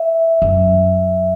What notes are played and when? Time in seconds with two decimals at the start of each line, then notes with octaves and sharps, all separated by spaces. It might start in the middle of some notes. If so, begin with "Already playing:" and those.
Already playing: E5
0.42 F#2